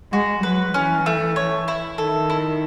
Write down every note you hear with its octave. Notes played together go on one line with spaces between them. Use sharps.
G#3 F#4
F#3 B4
E3 C#4
A3
C#5
E4
D#3 A4
E4